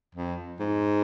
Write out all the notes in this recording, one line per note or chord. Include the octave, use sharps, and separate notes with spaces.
F2
G#2